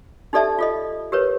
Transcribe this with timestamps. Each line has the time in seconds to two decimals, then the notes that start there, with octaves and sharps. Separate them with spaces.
0.33 D#4 G4 A4 D5 E5 A5
0.59 F4 A4 D#5
1.12 G4 A#4 B4 C#5